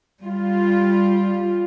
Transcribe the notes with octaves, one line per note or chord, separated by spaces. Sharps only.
G3 F4